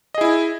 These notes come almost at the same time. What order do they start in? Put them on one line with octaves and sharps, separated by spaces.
D#5 G#4 E4